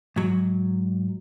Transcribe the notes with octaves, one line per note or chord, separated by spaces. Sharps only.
G#2 F#3